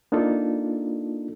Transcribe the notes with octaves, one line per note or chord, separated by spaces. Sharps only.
A#3 D4 D#4 F4 A4